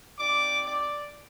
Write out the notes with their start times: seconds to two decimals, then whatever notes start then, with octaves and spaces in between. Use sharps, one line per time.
0.19 C4 D#4 G4 D5 D6
0.66 D5 D6